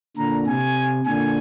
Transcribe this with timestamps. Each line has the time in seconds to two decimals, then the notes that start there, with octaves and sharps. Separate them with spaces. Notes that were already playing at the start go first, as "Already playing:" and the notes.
0.17 A#2 D3 A#5
0.47 C3 G#5
1.06 A#2 D3 G#5